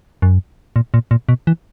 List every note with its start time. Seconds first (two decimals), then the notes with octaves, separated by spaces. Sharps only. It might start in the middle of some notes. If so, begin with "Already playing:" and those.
0.22 F#2
0.76 A#2
0.94 A#2
1.11 A#2
1.29 B2
1.47 E3